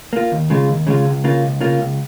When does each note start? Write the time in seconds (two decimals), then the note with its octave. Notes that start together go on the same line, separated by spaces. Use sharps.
0.13 A#3 F4
0.32 D#2
0.50 C#3 G#3 F4
0.68 D#2
0.87 C#3 G#3 F4
1.05 C#2
1.24 C#3 A#3 F4
1.42 C#2
1.61 C#3 A#3 F4
1.79 C#2